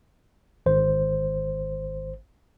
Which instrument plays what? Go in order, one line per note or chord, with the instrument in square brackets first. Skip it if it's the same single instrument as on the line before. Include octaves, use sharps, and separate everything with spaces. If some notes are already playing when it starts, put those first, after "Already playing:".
[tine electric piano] G#1 C5